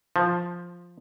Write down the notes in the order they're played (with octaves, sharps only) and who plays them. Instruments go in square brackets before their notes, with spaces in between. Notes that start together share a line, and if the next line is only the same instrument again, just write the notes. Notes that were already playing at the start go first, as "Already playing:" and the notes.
[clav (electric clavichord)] F3